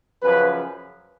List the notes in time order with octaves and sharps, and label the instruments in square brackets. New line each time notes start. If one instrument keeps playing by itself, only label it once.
[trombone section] F#2 C#3 F3 B4